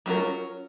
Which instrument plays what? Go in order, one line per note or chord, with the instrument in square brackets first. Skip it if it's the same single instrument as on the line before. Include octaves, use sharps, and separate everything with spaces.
[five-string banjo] F#3 C#4 F4 A#4